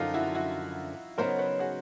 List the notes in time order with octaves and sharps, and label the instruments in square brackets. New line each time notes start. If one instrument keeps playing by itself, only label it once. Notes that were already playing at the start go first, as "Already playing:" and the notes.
Already playing: [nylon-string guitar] F#2 D3 F3 [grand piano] D#4 F4
[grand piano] E4 F#4
E4 F#4
[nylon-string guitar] C#3 F#3 B3 D#4 [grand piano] A#4 C5
[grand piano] B4 C#5
F#4 G#4